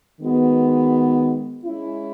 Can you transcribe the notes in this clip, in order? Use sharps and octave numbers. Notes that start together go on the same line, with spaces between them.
D#3 G#3 B3 F#4
G#3 C#4 E4